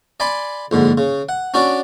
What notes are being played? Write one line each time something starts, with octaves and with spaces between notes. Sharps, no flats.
D5 G#5 B5 C6
A#1 G#2 D3
C#3
F#5
C#4 D4 F#4 D5